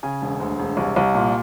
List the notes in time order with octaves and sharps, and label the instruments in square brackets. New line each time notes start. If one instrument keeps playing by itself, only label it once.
[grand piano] C#3 G#5
E1
D2
E1
C2
C2
A#2